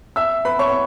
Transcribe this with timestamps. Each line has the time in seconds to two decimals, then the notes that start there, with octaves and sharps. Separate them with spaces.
0.16 E5 E6
0.45 B4 B5
0.59 C#5 C#6